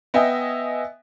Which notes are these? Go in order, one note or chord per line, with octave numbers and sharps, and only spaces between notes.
B3 D#5 E5 G5 G#5